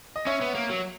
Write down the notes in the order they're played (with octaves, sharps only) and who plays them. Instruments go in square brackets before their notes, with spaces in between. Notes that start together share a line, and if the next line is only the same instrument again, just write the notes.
[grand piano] D#5
[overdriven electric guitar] C#4 [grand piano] C#5 E5
[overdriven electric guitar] B3
A#3
F#3